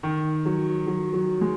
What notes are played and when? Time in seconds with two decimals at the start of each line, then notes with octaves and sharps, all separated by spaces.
0.03 D#3
0.45 F#3
0.87 F#3
1.14 F#3
1.41 G#3